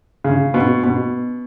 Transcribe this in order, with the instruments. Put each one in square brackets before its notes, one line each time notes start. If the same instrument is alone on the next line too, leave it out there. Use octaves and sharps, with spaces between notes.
[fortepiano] C#3
B2
B2